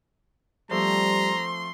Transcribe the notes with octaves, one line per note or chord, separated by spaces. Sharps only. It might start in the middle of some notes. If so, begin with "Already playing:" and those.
F3 G3 A3 C4 A#5 C6